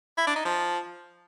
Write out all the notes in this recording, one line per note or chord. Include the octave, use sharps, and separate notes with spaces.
E4
D4
D#4
F3